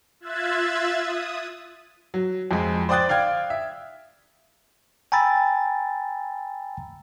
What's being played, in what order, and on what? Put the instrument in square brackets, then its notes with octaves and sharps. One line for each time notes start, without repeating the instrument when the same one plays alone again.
[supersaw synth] F4 E5 E6 F#6 G#6 A6
D#6
[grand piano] F#3
F2 G#3
C5 D5 G5 D#6 F#6 A6
D5 F5 G5 F6 G#6
E5
[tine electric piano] G5 G#5 A#5 B5 E6 A6